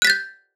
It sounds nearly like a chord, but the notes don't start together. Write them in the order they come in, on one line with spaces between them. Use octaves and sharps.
F#6 B6 A6 G6